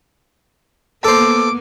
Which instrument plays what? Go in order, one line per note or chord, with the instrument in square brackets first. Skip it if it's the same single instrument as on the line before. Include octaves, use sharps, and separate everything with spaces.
[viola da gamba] A#3 B3 [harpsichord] A4 C5 [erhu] D6